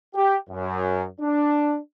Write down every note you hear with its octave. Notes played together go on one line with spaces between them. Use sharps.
G4
F#2
D4